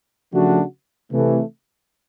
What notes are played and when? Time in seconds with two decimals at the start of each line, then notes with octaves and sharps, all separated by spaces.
0.33 C#3 F3 A3 D4 F#4
1.12 C3 E3 A3